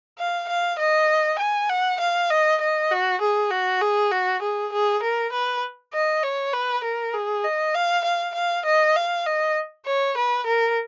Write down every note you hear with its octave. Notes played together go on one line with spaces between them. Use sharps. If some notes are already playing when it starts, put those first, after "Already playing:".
F5
F5
D#5
G#5
F#5
F5
D#5
D#5
F#4
G#4
F#4
G#4
F#4
G#4
G#4
A#4
B4
D#5
C#5
B4
A#4
G#4
D#5
F5
F5
F5
D#5
F5
D#5
C#5
B4
A#4